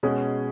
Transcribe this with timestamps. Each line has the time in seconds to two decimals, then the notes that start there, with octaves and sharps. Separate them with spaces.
0.03 B2 G#3 C#4 G#4